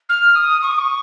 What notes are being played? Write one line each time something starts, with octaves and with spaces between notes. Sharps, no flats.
F6
D#6
C#6
D#6
C#6